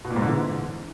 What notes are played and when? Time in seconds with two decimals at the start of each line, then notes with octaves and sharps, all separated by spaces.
0.05 B2
0.10 A#2
0.16 G#2
0.22 D3
0.28 E3